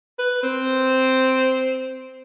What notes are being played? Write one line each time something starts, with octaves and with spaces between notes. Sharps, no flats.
B4
C4